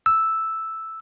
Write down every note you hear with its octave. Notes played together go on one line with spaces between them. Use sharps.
E6